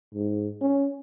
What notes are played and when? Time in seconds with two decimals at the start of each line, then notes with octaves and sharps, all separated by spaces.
0.14 G#2
0.61 C#4